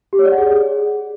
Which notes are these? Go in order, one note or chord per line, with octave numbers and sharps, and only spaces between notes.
G4
C#5
D5
F#5
G#4